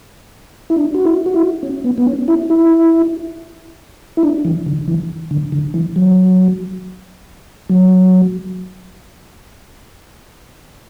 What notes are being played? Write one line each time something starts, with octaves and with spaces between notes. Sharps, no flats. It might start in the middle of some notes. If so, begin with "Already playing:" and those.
E4
D4
F#4
E4
F#4
E4
C#4
B3
B3
C#4
E4
E4
E4
D4
E3
D3
E3
D3
D3
E3
F#3
F#3